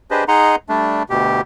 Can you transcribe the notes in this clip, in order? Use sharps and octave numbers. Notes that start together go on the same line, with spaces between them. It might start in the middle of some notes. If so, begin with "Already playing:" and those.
D4 G4 G#4 B4 C5 D#5
D#4 G#4 D#5 F#5 A#5 C6
G3 A3 D4
D2 B2 G4